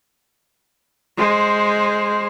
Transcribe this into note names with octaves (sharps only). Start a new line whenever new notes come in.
G#3 C5